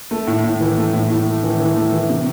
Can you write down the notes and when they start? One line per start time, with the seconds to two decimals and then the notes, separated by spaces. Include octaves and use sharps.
0.11 A3
0.27 A2
0.44 A2
0.61 E3
0.78 A3
0.94 A2
1.10 A2
1.27 A3
1.43 E3
1.60 E3
1.77 A3
1.92 E3
2.09 C3